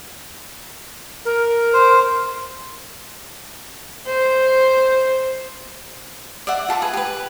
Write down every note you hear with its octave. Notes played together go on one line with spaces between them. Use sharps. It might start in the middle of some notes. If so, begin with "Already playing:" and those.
A#4
C5
C5
D5 E5 F#5
F4 A4 A5 D6
G#4 B4
G4 B4